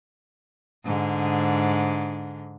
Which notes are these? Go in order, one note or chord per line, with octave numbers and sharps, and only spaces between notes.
G#2 D3